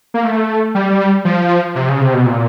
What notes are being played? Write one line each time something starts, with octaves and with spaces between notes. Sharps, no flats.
A#3
A3
G3
F3
C3
C#3
C3
B2
A#2